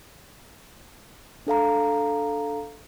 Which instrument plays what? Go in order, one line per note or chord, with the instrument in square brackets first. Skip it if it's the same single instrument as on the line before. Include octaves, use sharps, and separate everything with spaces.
[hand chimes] D4 A4 F5 A#5